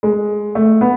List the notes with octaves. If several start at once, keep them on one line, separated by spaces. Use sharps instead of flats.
G#3
A3
B3